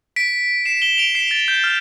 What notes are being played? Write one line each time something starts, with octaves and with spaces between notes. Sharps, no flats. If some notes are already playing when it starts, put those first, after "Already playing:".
B6 D7
C7 E7
E7 G7
D7 F7
C7 E7
A6
G6
F6